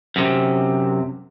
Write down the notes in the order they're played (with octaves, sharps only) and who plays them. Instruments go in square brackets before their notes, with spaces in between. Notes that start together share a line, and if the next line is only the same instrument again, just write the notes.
[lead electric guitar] F#2 C3